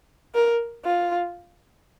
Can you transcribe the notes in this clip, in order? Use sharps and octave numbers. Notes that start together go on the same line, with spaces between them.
A#4
F4